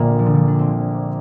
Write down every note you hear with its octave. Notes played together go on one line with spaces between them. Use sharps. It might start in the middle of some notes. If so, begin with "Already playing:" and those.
Already playing: A#1 A#2 D3 A#3
F3
D3
F3
D4
C4